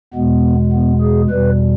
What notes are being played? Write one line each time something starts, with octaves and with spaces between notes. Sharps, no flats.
E2 B2 G#3 B3
B3
G#4
E2 B2 G3 B4